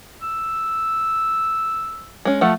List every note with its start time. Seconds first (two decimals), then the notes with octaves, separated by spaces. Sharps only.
0.22 E6
2.25 G#3 C#4
2.41 F3 A3 A4 F#5